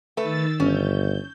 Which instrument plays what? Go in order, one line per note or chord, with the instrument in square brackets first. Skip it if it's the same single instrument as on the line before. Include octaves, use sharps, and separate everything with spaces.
[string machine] D#3 E6 A6 [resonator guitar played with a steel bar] A3 B4
[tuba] G1 [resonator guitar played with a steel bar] C#4 [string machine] G6